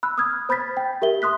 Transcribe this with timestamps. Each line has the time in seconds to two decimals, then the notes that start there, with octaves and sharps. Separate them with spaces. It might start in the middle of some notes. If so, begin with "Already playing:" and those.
0.03 B5 E6 F#6
0.18 D#6 F6 G#6
0.49 C5 B5 G6 A6 B6
0.77 G5
1.02 G4 A#4 E5 G7
1.22 C6 D#6 F#6 B6